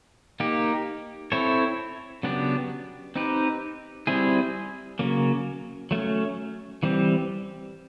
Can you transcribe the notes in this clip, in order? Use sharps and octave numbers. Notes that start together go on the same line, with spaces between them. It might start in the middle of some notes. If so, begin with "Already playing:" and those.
A#3 D#4 G4
C4 E4 A4 C#5
C#3 F#3 B3 D4 G4
C4 D#4 G4 B4
G3 C4 E4 G#4
C#3 F#3 A#3
F#3 A3 C#4
E3 G3 C4